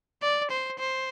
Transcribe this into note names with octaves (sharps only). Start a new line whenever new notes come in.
D5
C5
C5